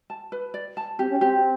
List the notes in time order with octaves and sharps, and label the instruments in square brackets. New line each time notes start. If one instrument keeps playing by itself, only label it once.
[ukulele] A5
B4
D5
A5
[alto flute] C4 [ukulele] G4
[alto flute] C#4
[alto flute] C4 [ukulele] G4